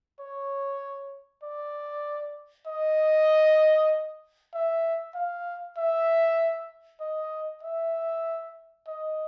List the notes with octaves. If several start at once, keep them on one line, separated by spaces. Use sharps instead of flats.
C#5
D5
D#5
E5
F5
E5
D#5
E5
D#5